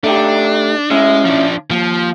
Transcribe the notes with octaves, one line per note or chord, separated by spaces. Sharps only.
A3 D4 D#4 G4
G#3 C#4 E4 E5
F3 D4
D#2 F3